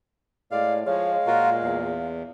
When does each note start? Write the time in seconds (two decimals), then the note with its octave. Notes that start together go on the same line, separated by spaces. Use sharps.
0.51 A2 G#3 D5 F5
0.87 F3 G#3 C#5 F5
1.27 A#2 F4 F#4 A#4
1.62 E2